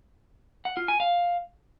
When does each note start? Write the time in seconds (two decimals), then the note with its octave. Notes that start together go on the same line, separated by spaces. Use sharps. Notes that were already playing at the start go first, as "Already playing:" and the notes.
0.65 F#5
0.77 F4
0.88 G#5
1.00 F5